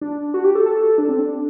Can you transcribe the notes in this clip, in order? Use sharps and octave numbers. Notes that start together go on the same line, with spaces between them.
D4
F#4
G4
A4
A4
D4
C4
D4